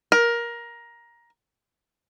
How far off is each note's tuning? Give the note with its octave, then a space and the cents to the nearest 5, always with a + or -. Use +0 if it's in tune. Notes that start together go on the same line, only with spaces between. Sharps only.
A#4 +15